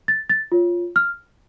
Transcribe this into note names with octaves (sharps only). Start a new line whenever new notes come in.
A6
A6
F4 C#5
F6